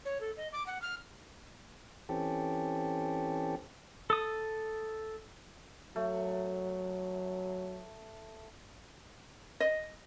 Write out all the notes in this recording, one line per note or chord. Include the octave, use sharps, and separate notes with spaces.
C#5
A4
D#5
D6
F#5
F6
E3 C4 C#4 G4 A4
A4 D#6
F#3 A3
D#5